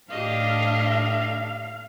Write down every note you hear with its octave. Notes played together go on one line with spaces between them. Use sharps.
A2 D4 G4 D#5 F5